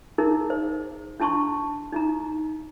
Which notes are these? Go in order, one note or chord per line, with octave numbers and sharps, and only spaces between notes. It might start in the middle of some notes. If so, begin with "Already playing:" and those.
D#4 E4 G#4 A#4
C5
D4 E4 A5 C6 C#6
D#4 E4 A#5